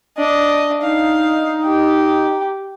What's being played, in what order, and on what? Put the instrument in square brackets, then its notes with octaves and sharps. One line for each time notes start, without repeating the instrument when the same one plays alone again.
[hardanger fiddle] D4 D#5
[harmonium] D#4 [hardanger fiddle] F5
[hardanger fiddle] G4